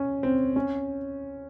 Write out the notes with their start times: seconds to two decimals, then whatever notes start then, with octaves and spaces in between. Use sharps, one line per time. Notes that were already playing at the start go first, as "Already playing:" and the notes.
Already playing: C#4
0.23 C4
0.56 C#4